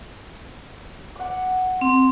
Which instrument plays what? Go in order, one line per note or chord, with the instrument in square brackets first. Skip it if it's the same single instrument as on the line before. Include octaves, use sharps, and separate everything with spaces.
[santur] F#5 D6
[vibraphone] C4